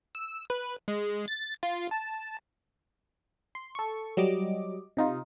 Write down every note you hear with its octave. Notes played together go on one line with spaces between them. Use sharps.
E6
B4
G#3
A6
F4
A5
C6
A4 C#6
F#3 G3 D#5 D6
C3 D#4 F4